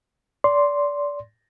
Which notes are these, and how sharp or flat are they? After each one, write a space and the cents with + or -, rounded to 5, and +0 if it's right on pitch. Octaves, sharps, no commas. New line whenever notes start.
D5 -25 C6 +0